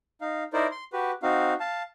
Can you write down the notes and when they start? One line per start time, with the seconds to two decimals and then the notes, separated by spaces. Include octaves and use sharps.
0.21 D#4 F5
0.53 D#4 E4 A#4 C5 D5
0.71 C6
0.93 F#4 G4 B4
1.23 C4 D#4 F#4 F5
1.60 F5 A5